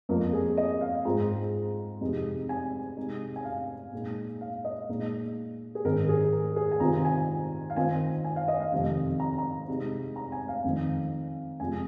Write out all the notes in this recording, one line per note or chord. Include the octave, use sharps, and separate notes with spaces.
F2 F3 A#3 A#4
G#4
D#5
F5
G#2 G#3 C4 F4 A#5
F2 C3 G#3 D#4
G#5
C3 G#3 D#4
G#5
F5
A#2 G#3 D#4
F5
D#5
A#2 G#3 D#4
G#4
G#2 D#3 C4 D#4 A#4
G#4
A#4
G#4
G#5
C3 D#3 C4 F4 A#5
G#5
F5
D#3 C4 F4 G#5
G#5
F5
D#5
F5
F2 C3 D#3
A#5
A#5
C3 G#3 D#4
A#5
G#5
F5
F2 D#3 C4 D#4
F2 C3 G#3 F4 G#5